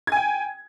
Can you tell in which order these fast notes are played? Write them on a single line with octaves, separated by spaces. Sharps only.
G#6 G#5 G5